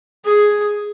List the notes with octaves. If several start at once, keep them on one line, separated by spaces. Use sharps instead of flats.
G#4